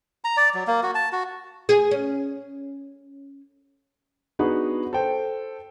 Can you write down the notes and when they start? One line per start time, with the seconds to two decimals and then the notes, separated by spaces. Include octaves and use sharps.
0.24 A#5
0.37 D5
0.54 F#3
0.67 A#3
0.83 F#4
0.95 A5
1.12 F#4
1.69 G#4
1.91 C#4
4.39 B3 D4 D#4 F#4 G#4 B4
4.93 A4 C5 G5